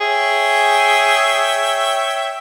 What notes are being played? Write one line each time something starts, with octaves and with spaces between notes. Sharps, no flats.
G#4 C#5 E5 G5